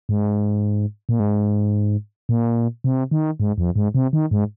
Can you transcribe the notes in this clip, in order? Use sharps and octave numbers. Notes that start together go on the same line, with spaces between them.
G#2
A#2
G#2
A#2
C3
D#3
G#2
F2
G#2
C3
D#3
G#2